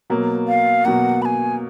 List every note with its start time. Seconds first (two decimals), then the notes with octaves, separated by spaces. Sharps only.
0.10 B2 F#3 A#3
0.48 F5
0.85 B2 F#3 A#3 F#5
1.22 B5
1.25 G#5